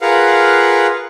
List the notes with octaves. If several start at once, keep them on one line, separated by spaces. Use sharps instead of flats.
F4 G#4 A#4 B4 F5 F#5